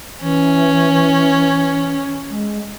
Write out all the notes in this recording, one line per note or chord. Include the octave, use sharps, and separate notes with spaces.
E3 C#4
G#3